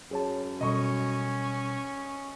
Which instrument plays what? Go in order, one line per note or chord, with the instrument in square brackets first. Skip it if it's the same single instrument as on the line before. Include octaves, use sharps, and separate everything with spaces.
[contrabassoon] F#2 [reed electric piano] G#4 C#5 A5
[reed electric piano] B2 G3 A4 [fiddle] C#4 [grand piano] D#5 C#6